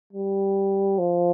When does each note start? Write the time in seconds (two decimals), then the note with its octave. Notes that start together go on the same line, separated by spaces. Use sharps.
0.13 G3
0.99 F3